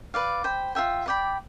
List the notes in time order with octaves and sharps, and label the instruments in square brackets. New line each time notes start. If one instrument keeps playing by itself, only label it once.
[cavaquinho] B4 D5 F5
C5 G5 B5
F4 A4 E5 G5
B4 D5 G5 B5